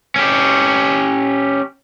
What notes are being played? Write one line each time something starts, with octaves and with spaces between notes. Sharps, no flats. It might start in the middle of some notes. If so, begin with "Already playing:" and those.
C#4 G4